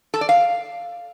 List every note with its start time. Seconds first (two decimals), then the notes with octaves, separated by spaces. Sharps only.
0.14 A4
0.21 D5
0.29 F5